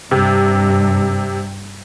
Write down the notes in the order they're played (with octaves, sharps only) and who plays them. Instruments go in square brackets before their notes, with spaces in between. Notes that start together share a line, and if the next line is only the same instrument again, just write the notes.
[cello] G2 [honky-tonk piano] C3